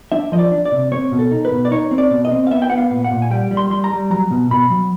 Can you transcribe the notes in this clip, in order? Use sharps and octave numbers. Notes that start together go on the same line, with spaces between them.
D4 E5
F3 D#5
D5
D4
D5
C3
C4 C#5
B2
A4
D#4
B4
B2
D5
D#4 C#5
C4
D5
B2
D#5
C4
F5
B3 E5
G5
B3 F#5
F5
A#2
F#5
A#2
G#5
G3 G5
G3
C6
G3 C6
A#5
G3
F#3 A#5
B2
B2 B5
F#3